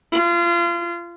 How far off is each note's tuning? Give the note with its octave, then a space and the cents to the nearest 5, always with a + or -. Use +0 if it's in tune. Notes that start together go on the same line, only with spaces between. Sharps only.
F4 -30